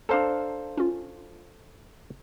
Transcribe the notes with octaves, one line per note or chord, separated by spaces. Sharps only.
D4 A4 C5 F5 A#5
C#4 F4